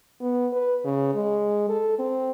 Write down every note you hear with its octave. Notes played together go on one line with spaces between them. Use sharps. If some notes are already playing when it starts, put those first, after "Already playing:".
B3
B4
C#3
G#3
A4
C4